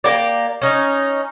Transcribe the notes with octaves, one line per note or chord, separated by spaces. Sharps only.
A#3 G4 D5
C#4 D#4